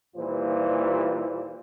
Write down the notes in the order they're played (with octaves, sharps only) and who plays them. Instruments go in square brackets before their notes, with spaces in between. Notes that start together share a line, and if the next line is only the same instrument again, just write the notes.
[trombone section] D#2 A#2 E3 G3 F4 C5